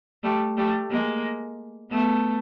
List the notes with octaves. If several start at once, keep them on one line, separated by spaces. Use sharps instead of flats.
G3 A3
G3 A3
G#3 A#3
A3 B3